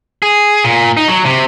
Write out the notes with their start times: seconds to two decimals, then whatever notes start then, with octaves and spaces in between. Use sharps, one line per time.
0.22 G#4
0.64 A#2
0.97 D#4
1.08 F#3
1.25 C3